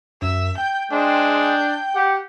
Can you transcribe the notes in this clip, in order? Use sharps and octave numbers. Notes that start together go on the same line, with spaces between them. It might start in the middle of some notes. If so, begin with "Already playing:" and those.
F#2 E5
G5 G6
G#3 D4 C5
G6
G4 F#5